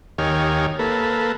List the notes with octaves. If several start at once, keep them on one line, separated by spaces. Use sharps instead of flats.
D#2 D#3 G4 C#5 G#5 F6
A#3 A4 B4